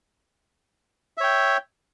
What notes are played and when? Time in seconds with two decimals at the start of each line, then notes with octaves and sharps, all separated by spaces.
1.18 E5
1.21 C#5
1.24 G5